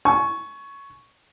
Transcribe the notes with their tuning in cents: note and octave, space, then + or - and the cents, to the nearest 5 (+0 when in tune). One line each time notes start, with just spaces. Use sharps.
G#5 +35 C#6 +0